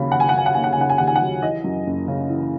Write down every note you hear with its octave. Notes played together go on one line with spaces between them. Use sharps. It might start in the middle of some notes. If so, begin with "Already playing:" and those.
Already playing: D#2 C#3 F#3 A#3 B5
D#2 F#5
G#5
F#5
F#3 G#5
F#5
A#3 G#5
F#5
G#5
C#3 F#5
G#5
D#2 F#5
G#5
F#5
F#3
E3 D#5
F#2
F#1
C#3
E3